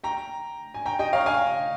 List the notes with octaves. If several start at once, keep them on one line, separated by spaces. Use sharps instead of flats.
G5 A#5
G#5
G5 A#5
D#5 G5
C#5 F5
F5 G#5